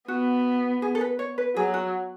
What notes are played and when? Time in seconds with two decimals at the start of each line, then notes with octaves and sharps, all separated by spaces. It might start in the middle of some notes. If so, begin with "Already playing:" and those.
0.08 B3 F#4
0.82 G#4
0.95 A4
1.01 B4
1.19 C#5
1.38 B4
1.56 F#3 G#4
1.74 F#4